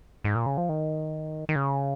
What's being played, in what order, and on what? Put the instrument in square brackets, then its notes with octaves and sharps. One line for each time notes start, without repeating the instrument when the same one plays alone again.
[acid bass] G#2
A#2
C#3
F3
D#3
D#3
C#3